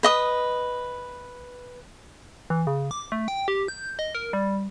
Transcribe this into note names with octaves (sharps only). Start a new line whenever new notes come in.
B4 D#5 D#6
E3
C#3
D6
A3
G5
G4
G6
D#5
A#4
G3